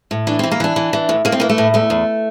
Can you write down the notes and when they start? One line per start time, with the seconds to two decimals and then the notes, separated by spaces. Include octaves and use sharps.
0.11 A2
0.27 E3 D4
0.39 C4
0.44 E3
0.52 A#3
0.60 E3 D4
0.76 E3
0.93 E3
1.09 A2
1.25 A2 A#3
1.32 C4
1.40 E3 A#3
1.49 A3
1.58 A2
1.74 E2 A3
1.90 E2